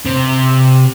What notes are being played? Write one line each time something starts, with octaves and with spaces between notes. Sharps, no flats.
C3